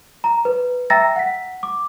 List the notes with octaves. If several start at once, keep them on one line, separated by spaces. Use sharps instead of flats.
A#5
B4
E5 G5 A#5 E6 A6 A#6
F#5 B6
D6